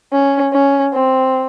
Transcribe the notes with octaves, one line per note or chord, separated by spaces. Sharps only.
C#4
C#4
C4